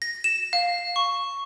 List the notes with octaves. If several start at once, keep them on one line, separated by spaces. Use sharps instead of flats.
A#6
E7
F5
C#6